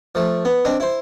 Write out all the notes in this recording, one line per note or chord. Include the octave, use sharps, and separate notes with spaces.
F3 A3
B3
C4 D4 D#5
E4 C5